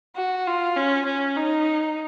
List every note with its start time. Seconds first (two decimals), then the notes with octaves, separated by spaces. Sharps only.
0.17 F#4
0.47 F4
0.77 C#4
1.06 C#4
1.37 D#4